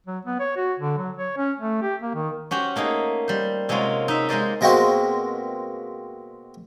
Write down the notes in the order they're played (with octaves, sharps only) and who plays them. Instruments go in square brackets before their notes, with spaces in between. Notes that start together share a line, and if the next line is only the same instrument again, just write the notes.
[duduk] F#3
B3
C#5
F#4
D3
F#3
C#5
C#4
A3
G4
A#3
D#3
[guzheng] C#4 F#4 G4 C5
A3 A#3 D#4 G#4
G3 C5
C3 G#3 A#3 C#4 F4 F#4
D#4 E5
G#3 A#3 A#4 C5 D5 D#5
[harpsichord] B2 G#3 A#3 C4 F#4